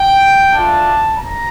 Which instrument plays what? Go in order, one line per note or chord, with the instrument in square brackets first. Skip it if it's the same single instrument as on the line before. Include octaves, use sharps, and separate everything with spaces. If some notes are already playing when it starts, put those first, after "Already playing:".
Already playing: [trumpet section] G5
A3 D4 F4 A5
A#5